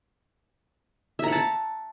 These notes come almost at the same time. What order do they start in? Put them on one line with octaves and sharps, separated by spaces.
E5 A#5 F#5 A5